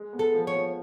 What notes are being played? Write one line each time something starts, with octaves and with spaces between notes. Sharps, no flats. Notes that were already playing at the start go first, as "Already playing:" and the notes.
Already playing: G#3
B3
A4
F3
C#5
F3